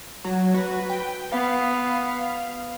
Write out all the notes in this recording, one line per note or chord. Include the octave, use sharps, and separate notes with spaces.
F#3
F#4 B4
G5
B3 F5